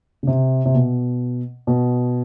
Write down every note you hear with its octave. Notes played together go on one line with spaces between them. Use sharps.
C#3
C3
C3
B2
B2